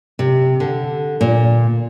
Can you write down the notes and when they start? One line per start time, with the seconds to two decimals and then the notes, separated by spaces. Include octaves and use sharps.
0.19 C3
0.60 D3
1.21 A#2